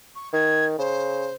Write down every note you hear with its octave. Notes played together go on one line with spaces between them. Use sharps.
C#6
D#3 G#6
C#3 C5